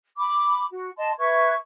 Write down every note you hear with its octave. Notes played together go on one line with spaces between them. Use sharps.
B5 D6
F#4
D#5 A5 C6
B4 E5 C#6 G#6